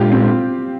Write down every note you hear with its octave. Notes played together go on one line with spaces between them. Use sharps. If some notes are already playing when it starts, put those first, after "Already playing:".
Already playing: A#2 G#3 D4 F4 G4
C4